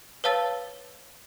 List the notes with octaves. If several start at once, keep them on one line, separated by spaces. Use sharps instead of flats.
B4 C#5 F5 A5 E6 A6